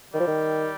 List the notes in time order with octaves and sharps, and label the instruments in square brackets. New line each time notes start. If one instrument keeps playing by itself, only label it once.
[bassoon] D#3 [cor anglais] G3
[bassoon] F3
D#3